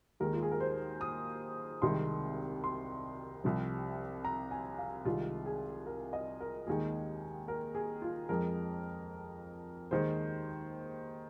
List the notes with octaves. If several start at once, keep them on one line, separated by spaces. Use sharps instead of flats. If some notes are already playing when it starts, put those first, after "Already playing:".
D#2 D#3 G#3 A#4
F4
G#4
A#4
C5
D#6
C2 C3 D#3 G#3 C6
C6
C2 C3 F3
A#5
G#5
F5
C2 C3 D#3 G#3 F4
G#4
A#4
D#5
A#4
D#2 D#3 G#3 G#4
A#4
G#4
F4
F2 F3 G#3 A#4
D#2 D#3 G#3 C5